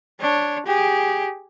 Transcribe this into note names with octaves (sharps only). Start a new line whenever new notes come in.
D4 C#5
G4 G#4